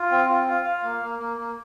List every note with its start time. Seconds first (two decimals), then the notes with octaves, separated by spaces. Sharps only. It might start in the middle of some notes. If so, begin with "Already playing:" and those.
Already playing: F4
0.11 C4
0.29 F4
0.47 F4
0.65 F5
0.83 A#3
1.01 A#3
1.19 A#3
1.37 A#3